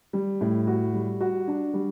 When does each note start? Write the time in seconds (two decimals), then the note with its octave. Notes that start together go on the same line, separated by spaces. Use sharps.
0.13 G3
0.41 A2
0.67 F#4
0.94 G3
1.21 F#4
1.48 D4
1.74 G3